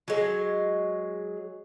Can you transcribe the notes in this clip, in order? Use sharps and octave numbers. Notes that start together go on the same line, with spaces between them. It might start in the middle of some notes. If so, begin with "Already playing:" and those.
F#3 G#3